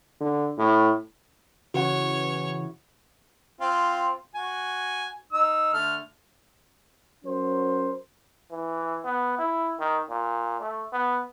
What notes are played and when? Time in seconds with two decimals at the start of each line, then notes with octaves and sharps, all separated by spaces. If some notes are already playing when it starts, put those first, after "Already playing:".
0.21 D3
0.58 A2
1.74 C#3 E3 F#4 C#5 F#5
3.61 C4 F4
4.35 F#4 G#5
5.32 D#4 E6
5.73 D3 A3 F6
7.25 F#3 C#4 A#4 C5
8.51 E3
9.05 B3
9.38 E4
9.80 D#3
10.10 A#2
10.61 A3
10.93 B3